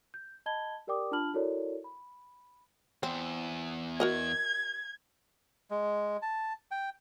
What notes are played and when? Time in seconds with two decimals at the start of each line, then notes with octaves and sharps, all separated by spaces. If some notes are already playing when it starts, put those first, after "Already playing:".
0.14 G6
0.46 D#5 A5 B5 G#6 G7
0.87 G4 A#4 D5 G5 D6 D#6
1.11 D4 F4 A5 B5 F6 F#7
1.34 E4 F#4 A4 A#4 C#5 D5
1.84 B5
3.03 E2 C4
4.00 F#4 A#4 D#5 G#6
5.70 G#3
6.22 A5
6.71 G5